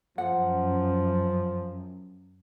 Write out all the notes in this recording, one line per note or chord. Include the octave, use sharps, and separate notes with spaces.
F#2 F3 F#5